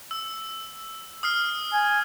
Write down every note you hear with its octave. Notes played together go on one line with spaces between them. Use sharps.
E6
D#6 F6 C7
G#5